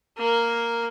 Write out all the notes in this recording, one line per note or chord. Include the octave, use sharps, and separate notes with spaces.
A#3 A#4